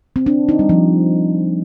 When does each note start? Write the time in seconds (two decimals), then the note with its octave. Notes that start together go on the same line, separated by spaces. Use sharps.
0.16 C4
0.26 D4
0.49 D#4
0.59 G3
0.69 F3